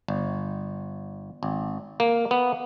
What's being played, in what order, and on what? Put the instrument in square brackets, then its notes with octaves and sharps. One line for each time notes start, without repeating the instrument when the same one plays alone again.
[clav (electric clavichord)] G1
G#1
A#3
B3